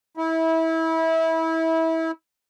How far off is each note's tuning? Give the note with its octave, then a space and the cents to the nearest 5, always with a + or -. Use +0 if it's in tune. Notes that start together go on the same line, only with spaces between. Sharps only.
E4 -25